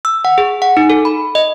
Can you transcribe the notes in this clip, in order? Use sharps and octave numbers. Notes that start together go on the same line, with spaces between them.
E6
F#5
G#4
F#5
D#4
A4
B5
D#5